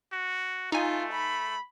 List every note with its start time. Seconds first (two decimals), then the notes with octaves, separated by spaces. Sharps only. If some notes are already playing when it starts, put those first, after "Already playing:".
0.12 F#4
0.72 A3 D#4 F4 G#5
1.13 B5